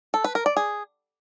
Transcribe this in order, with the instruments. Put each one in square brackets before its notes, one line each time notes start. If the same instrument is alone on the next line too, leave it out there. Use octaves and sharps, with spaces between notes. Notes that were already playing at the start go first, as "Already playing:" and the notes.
[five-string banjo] A4
B4
A#4
D5
G#4